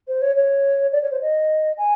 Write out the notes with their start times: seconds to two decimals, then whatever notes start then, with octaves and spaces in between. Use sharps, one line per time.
0.08 C5
0.22 C#5
0.36 C#5
0.92 D5
1.02 C#5
1.11 C5
1.21 D#5
1.78 G#5